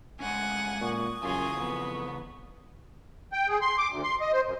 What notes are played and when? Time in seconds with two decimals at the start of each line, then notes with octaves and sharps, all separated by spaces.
0.20 G#3 A3 C#4 F#5 G#5
0.81 A#2 C#6 D#6
1.23 F#2 C#3 E3 F4 G#4 G#5
1.59 F2 B3
3.33 G5
3.48 G#4
3.61 C6
3.78 D6
3.90 D2
4.03 C6
4.21 D#5
4.33 C5
4.45 F#2